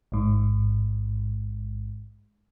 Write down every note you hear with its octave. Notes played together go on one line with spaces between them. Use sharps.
A1 G#2